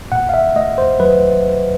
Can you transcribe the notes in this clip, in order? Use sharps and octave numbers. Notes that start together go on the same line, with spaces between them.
A#2 F#5
F5
E5
A3 D#5
C5
F#3 B4